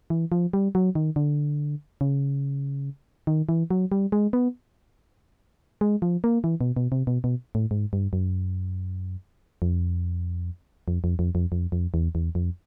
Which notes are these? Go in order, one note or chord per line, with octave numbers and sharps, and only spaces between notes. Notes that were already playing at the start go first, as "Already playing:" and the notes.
E3
F3
G3
F#3
D#3
D3
C#3
D#3
E3
F#3
G3
G#3
B3
G#3
F3
A#3
E3
B2
B2
C3
B2
B2
A2
G#2
G2
F#2
F2
F2
F2
F2
F2
F2
F2
E2
E2
F2